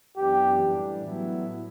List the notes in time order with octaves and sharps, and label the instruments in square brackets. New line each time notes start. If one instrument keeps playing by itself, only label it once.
[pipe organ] F#2 E3 B3 D4 [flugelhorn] G4
[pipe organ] A2 E3 G3 D4
A2 F#3 B3 E4